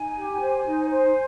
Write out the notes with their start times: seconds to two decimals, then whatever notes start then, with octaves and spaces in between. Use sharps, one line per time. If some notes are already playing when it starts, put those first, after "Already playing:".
Already playing: D#4 G#5
0.14 G4
0.40 C5
0.65 D#4
0.90 C5